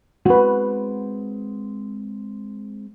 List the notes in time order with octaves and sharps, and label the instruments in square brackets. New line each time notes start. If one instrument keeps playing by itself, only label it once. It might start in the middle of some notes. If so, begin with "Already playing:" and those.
[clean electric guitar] G#3 C4 F#5 [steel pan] F#4 B4